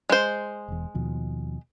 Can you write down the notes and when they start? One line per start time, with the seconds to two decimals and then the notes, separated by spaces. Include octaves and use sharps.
0.10 G#3 C5
0.68 E1 E2
0.95 D#2 B2 F3